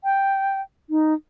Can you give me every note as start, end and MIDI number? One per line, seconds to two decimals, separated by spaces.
0.04 0.61 79
0.90 1.14 63